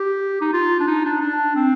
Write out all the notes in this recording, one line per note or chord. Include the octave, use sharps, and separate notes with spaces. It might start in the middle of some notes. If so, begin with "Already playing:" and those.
Already playing: G4
D#4
F4
D4
D#4
D4
D4
C4